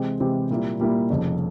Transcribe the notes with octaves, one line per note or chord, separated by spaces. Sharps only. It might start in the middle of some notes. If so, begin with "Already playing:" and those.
Already playing: C3 E3 G#3 C4 G4
C3 E3 G#3 C4 G4
A#2 G3 A#3 E4
A#2 G3 A#3 E4
F1 F2 C#3